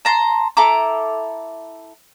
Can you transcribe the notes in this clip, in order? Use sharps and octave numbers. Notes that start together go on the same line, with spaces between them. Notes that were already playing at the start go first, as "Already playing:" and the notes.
A5 A#5 C6
E4 A4 A#5 D6